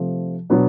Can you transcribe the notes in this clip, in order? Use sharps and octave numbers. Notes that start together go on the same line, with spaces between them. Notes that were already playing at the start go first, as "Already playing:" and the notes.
Already playing: C3 F3 A3
B2 F#3 B3 D4